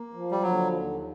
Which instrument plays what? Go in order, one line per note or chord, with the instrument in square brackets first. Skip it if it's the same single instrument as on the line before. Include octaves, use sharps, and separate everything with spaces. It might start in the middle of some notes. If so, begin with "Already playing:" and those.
Already playing: [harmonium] A#3
F3
[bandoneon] G3
[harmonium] D3 [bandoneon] F#3
[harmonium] D#2